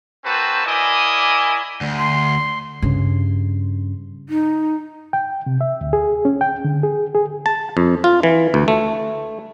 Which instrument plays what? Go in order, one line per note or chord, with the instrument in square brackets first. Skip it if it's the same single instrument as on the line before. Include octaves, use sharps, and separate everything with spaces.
[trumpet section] A#3 C4 F#4 B4 C5 A5
A#3 E4 D5 D#5 G#5
[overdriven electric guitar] D2
[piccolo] C6
[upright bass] G2 C#3
[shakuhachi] D#4
[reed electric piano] G5
C3
E5
D2
G#4
C#4
G5
D3
G#4
G#4
[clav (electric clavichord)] A5
F2
F4
E3
D2
A3